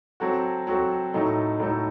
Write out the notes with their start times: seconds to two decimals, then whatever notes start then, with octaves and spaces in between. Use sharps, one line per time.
0.20 F#3 C4 F#4 A4
0.67 F#3 C4 F#4 A4
1.14 A2 F#3 A3 D#4 A4
1.60 A2 F#3 A3 D#4 A4